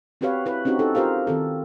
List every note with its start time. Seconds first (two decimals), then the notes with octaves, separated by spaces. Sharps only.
0.21 C4 F#4 G4 B4 C#5 F5
0.46 E4 B4
0.65 C4 C#4 D#4 F#4 G4
0.79 D#4 A4
0.95 F4 G4 A#4 C5 F5
1.27 D#3 C4 A4